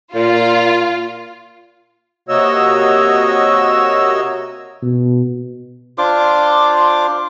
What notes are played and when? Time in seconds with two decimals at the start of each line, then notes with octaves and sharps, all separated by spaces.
0.15 A#2 F4
2.29 C3 A#3 F#4 C#5 D#5 E6
4.82 B2
5.98 D4 F4 C5 D6